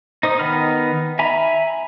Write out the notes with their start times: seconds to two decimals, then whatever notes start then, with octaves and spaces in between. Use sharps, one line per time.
0.23 D#4 C5 D#6
0.39 D#3 B3 D#4 B5 F6
1.19 E5 G#5 A#5 B5